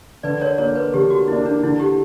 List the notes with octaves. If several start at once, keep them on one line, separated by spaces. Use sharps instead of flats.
D3 B4 D5
A#4 C#5
A#3 D4 A#4 C#5
B4
D3 G4
F#4
A#3 D4 E4
D4
D3 E4
G4